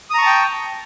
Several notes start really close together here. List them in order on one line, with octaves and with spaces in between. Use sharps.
D#6 A#5 C#6 A5 G5